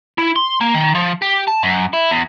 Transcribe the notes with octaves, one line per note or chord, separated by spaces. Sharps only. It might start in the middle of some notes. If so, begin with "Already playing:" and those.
E4
C6
A#3
D#3
F3
G4
A5
F#2
E4
E2